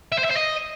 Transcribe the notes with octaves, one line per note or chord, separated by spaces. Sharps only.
E5
C5
E5
C5
D#5